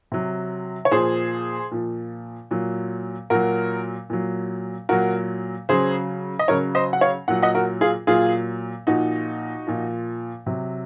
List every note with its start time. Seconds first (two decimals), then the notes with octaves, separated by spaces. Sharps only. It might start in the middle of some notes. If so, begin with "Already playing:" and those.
0.12 C3 F#3
0.85 C#5
0.91 A#2 F3 G#4 C5
1.72 A#2 F3
2.51 A#2 F#3
3.30 A#2 F#3 F#4 A#4
4.10 A#2 F#3
4.89 A#2 F#3 F#4 A#4
5.69 C#3 F#3 G#4 C5
6.39 D#5
6.48 C#3 F#3 A#4 C#5
6.75 C5 D#5
6.93 F#5
7.01 C#5 F5
7.28 A#2 F#3 F#5
7.42 D#5 F#5
7.55 F#4 A#4
7.81 F4 G#4
8.07 A#2 F#3 F4 G#4
8.87 A#2 F3 D#4 F#4
9.67 A#2 F3
10.46 C3 F#3